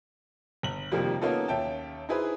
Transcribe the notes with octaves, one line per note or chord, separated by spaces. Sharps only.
G1 F#7
F2 C3 D#3 F3 G3 A#3
A#3 B3 C#4 D#4 F4 A4
D#2 C#4 E5 G5 A5
D#4 E4 G#4 B4 C5